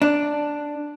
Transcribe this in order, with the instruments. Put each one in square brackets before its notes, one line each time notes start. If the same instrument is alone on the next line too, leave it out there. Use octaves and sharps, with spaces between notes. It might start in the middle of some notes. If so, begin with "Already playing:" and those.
[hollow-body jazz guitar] D4